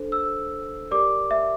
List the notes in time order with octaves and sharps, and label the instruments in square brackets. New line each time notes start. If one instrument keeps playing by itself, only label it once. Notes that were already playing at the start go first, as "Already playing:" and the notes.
Already playing: [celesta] D4 A4 C5
E6
G4 A#4 D5 D6
E5